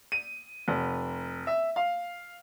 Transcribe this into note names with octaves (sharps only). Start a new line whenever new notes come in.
D#7
F1
E5
F5